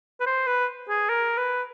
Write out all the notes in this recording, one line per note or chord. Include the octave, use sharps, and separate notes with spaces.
B4
C5
B4
G#4
A#4
B4